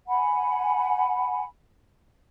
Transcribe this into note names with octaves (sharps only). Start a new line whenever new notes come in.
F#5 G#5 B5